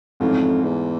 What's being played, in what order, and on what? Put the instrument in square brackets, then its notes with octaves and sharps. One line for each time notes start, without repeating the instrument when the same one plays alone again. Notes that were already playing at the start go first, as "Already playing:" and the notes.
[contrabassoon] F2 [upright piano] G#2 E3 A3 C#4
[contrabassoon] E2